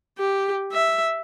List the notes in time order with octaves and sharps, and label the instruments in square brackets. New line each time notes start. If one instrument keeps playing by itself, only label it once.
[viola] G4
E5